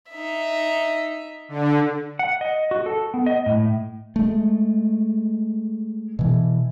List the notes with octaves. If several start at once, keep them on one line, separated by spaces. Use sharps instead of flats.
D#4 E5
D3
F#5
D#5
F#4
A4
B3
D#5
A2
G#3 A3
B2 E3